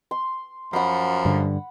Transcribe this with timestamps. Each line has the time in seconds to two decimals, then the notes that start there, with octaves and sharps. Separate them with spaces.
0.11 C6
0.73 F#2 F3 F#5 B5
1.25 G2 D3